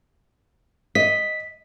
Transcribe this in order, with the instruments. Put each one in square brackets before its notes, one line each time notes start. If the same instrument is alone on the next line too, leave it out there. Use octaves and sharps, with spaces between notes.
[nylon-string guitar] D#5 [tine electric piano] B6